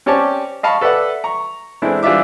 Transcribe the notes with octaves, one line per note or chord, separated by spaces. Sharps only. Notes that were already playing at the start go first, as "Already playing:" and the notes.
C4 C#4 G4 C#5 D5 A5
D#5 F5 A5 B5 C#6
A4 B4 D5 E5 F#5
A#5 C#6
E3 G#3 A3 C4 D4 E4
E3 G3 D4 F4 E5 D6